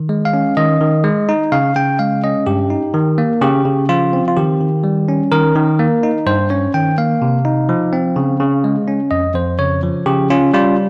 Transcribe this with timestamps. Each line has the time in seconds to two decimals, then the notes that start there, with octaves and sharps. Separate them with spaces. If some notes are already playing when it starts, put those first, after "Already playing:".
Already playing: D#3
0.09 G#3
0.25 F5
0.34 C#4
0.57 D#3 D#5
0.81 D#3
1.04 G#3
1.29 D#4
1.52 C#3 F5
1.76 C#3 G5
1.99 G#3 F5
2.24 C#4 D#5
2.46 G2 G4
2.70 D#4
2.94 D#3
3.18 A#3
3.42 C#3 G4
3.65 C#3
3.89 F3 F4
4.13 C4
4.28 F4
4.37 D#3 G4
4.60 D#3
4.84 G3
5.08 C#4
5.32 D#3 A#4
5.55 D#3
5.79 A#3
6.03 D#4
6.26 G2 C5
6.50 C#4 C#5
6.74 D#3 G5
6.98 A#3 F5
7.22 C3
7.45 D#4
7.69 F3
7.93 C4
8.16 C#3
8.40 C#3
8.64 G#3
8.88 C#4
9.11 F2 D#5
9.35 F2 C5
9.59 C#3 C#5
9.83 F3
10.06 C#3 G4
10.30 C#4 F4
10.54 G3 F4